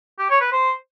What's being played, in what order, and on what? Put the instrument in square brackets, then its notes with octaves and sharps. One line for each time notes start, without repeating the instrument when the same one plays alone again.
[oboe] G4
C#5
B4
C5